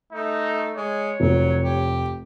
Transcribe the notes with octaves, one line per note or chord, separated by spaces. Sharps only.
A3 D#4
G#3 C#5
F1 F#3
G4